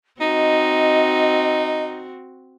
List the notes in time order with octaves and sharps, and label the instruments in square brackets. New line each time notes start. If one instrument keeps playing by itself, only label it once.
[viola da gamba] C4 F#4 [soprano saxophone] D#4 [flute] D#5